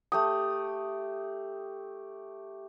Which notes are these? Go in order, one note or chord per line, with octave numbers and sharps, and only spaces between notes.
A3 G4 D#6